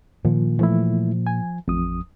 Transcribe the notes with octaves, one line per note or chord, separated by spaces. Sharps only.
A#2 D#3 F3
E3 F3 A3 E4
G#5
A1 F2 D#6